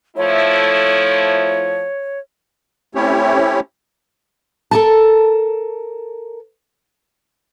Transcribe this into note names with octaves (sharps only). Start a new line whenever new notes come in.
F3 A3 E4 C#5
A3 C4 C#4 E4 G4 C#5
A4 A#4 A5